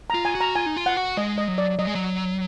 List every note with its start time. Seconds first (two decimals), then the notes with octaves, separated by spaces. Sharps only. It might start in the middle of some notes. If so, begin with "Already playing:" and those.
0.10 F4 A#5
0.25 G#5
0.35 F#4
0.41 A#5
0.55 F4 G#5
0.66 D#4
0.76 F4
0.86 F#5
0.97 F#4
1.17 G#3 D#5
1.38 D#5
1.48 F#3
1.58 D5
1.79 F#3 D#5
1.87 G#3
1.95 F#3